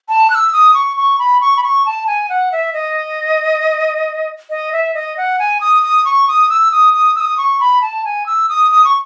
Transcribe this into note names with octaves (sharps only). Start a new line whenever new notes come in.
A5
F#6
E6
D#6
C#6
C#6
B5
C#6
B5
C#6
A5
G#5
F#5
E5
D#5
D#5
E5
D#5
F#5
G#5
D#6
D#6
C#6
D#6
E6
D#6
D#6
E6
D#6
C#6
B5
A5
G#5
E6
D#6
D#6
C#6